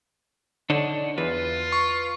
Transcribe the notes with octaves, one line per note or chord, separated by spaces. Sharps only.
D3 D4 D#4 C#5
E2 F4 B4
C#6